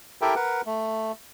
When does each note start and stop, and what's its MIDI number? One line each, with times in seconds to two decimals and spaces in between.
0.22 0.35 64
0.22 0.35 67
0.22 0.35 69
0.22 0.35 70
0.22 0.35 76
0.22 0.35 79
0.36 0.61 70
0.36 0.61 71
0.36 0.61 78
0.66 1.12 57